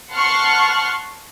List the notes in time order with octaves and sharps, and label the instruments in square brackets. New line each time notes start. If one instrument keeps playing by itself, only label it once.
[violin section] F#5 A5 C6 C#6 F6 F#6